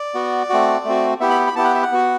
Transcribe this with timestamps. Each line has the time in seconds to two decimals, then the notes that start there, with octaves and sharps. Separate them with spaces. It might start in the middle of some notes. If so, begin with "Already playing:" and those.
Already playing: D5
0.14 B3 F#4
0.50 A3 C4 F#4
0.85 A3 C4 F#4
1.20 B3 E4 G4 E5
1.30 B5
1.47 B5
1.56 B3 E4 G4 A5
1.64 F#5
1.74 E5
1.82 F#5
1.92 B3 F#4